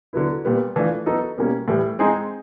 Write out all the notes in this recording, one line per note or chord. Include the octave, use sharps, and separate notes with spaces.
D3 F#3 B3 E4
A#2 G3 B3
E3 A3 D4 F4
F#3 B3 D#4 F#4 A4
B2 G3 A#3 C#4
A2 E3 G3
G#3 C4 D#4 G#4